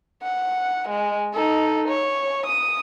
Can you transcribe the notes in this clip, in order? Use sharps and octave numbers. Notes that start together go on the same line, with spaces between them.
F#5
G#3
D#4 A4
C#5
D#6